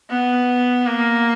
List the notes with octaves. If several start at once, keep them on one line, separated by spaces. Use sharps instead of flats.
B3
A#3